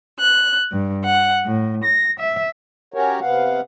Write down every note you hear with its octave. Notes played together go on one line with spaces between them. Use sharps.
F#6
G2
F#5
A2
A#6
E5
C#4 F#4 G4 A#4 C#5
C3 B3 F5 F#5